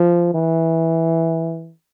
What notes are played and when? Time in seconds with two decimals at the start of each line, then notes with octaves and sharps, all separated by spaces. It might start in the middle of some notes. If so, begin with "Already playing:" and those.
Already playing: F3
0.34 E3